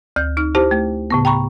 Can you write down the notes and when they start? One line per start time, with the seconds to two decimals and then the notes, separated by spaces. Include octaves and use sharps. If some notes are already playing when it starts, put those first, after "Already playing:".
0.16 D2 G6
0.37 D#4 F6
0.55 E4 G4 C5 A5
0.71 A3
1.10 A2 C#3 B3
1.25 G5 A#5 B5 C#6